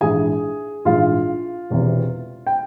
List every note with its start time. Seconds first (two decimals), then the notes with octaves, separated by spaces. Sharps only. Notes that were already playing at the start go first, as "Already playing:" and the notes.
0.01 A#1 G#2 E3 G#3 G#4 G#5
0.85 A#1 G#2 E3 G#3 F4 F5
1.70 E1 E2 C3 E3
2.47 G5